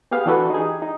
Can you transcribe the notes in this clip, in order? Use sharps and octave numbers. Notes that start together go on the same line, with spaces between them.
B3 G4 G#4 F5
E3 D4 F#4 A4 B4
D#4 G4 G#4
D#4